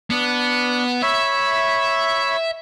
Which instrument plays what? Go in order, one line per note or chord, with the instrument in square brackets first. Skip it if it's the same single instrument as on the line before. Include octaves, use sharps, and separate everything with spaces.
[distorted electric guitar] B3 [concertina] D4
[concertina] C#5 B5 [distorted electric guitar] E5